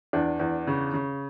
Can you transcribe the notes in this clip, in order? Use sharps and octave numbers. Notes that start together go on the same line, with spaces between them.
E2 D4
E2
C#3
C#3